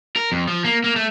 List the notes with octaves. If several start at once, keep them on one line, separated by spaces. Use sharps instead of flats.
A#4
F2
F3
A#3
A#3
A3